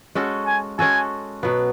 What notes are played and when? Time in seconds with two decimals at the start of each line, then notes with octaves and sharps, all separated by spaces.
0.15 G#3 C#4 F#4 A4
0.47 G#5
0.79 G#3 C#4 F#4 A4 G#5
1.43 B2 F#3 B3